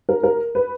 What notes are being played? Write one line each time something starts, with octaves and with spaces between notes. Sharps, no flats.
A#4
A#4
B4